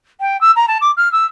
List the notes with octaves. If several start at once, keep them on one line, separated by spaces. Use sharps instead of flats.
G5
E6
A#5
A5
D6
F6
E6